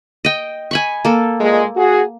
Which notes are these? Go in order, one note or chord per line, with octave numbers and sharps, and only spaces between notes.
D#5 G5
G#5 B5 C#6
A#3 A4
A#2 G#3
F#4 G#4